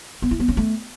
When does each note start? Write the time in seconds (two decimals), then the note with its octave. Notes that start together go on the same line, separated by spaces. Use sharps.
0.22 B3
0.31 E4
0.40 B3
0.48 C#4
0.57 A3